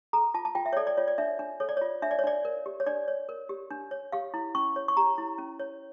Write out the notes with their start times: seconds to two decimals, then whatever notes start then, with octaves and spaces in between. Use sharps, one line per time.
0.13 A4 A#5
0.34 F4 A5
0.45 A5
0.55 F4 G5
0.66 E5
0.73 C#5
0.76 A4 D5
0.87 D5
0.97 F4 C#5
1.08 D5
1.18 D4 E5
1.39 D4
1.60 A4 C#5
1.69 D5
1.77 F4 C#5
2.02 D4 E5
2.11 D5
2.19 C#5
2.24 D4 D5
2.45 A#4
2.66 G4
2.80 C#5
2.86 D4 D5
3.08 C#5
3.29 A#4
3.49 G4
3.70 D4
3.91 C#5
4.12 G4 F5
4.34 E4
4.55 C#4 C#6
4.76 C#5
4.88 C#6
4.97 G4 A#5
5.18 E4
5.38 C#4
5.59 C#5